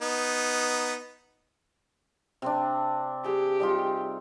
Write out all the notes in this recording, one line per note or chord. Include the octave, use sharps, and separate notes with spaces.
B3 D#4
C3 C4 D4
G4 G#4 G5
G3 D#4 F4